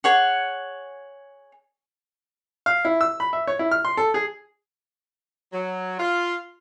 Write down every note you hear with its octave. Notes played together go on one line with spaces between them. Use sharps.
G#4 C#5 F#5
F5
E4
E6
B5
E5
C#5
E4
F6
C6
A4
G#4
F#3
F4